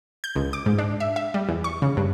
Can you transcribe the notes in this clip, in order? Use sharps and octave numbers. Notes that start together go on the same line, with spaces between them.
G6
C#2
D6
G#2
D4
E5
E5
G3
E2
C#6
C#3
G2